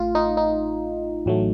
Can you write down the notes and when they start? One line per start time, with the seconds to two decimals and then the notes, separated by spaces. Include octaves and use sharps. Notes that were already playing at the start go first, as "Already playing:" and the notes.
Already playing: A1 A3 F4
0.15 D#4
0.37 D#4
1.26 A1 A2 F#3 A3